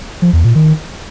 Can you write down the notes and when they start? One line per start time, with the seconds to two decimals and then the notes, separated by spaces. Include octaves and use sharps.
0.22 F3
0.33 E2
0.44 A#2
0.55 D#3